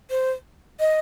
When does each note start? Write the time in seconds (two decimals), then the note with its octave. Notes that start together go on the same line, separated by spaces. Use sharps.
0.10 C5
0.80 D#5